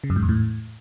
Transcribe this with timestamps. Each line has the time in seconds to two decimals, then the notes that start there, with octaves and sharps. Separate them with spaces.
0.04 C#3
0.10 F#2
0.16 G#2
0.23 E2
0.29 A2